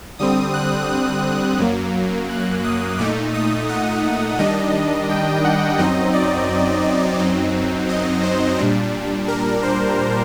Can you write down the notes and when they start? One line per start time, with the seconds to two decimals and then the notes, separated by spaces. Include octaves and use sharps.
0.19 D3 G3 C4 D#6
0.54 F#6
0.89 D#6
1.59 F#2 F#3 A#3
2.29 F#6
2.64 D#6
2.98 A#2 A3 D#4 D6
3.34 D#6
3.69 F#5
4.39 D#3 G3 D4 D#5
5.09 G5
5.44 F#5
5.78 F#2 F#3 C4 D#4 D#5
6.14 D5
7.19 F#2 F#3 C4 D#4
7.89 D#5
8.23 C5
8.58 A#2 G3 D4
9.28 A#4
9.63 C5